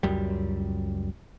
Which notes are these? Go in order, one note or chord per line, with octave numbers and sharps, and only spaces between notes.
C#2 F#2 G3